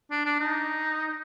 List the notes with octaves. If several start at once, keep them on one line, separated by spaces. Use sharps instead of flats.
D4
D4
D#4